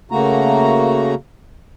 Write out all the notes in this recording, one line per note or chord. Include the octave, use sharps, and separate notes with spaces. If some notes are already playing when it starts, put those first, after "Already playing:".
C#3 A3 A#3 F#4 A#5